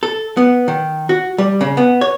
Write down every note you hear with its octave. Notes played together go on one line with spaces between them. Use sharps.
A4
B3
D#3
F#4
G3
C#3
B3
C#5